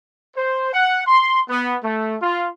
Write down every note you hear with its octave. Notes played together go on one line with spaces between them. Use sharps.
C5
F#5
C6
B3
A3
F4